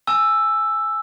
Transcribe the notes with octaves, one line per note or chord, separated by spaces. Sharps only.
G#5 E6